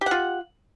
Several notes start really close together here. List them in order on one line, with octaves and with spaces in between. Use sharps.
G4 F#5 F4